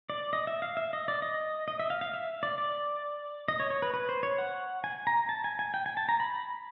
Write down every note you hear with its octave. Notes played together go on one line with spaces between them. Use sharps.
D5
D#5
E5
F5
E5
D#5
D5
D#5
D#5
E5
F5
F5
E5
D5
D5
D#5
C#5
C#5
B4
B4
C5
C#5
F#5
G#5
A#5
A5
G#5
G#5
G5
G#5
A5
A#5
B5